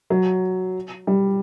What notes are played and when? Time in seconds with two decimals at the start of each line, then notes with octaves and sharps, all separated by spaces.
0.10 F#3
1.07 G3